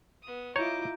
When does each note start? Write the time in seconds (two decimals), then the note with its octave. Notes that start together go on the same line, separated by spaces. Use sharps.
0.23 B3 D#6
0.56 E4 F4 C#5 D#5 A#5 D6 G6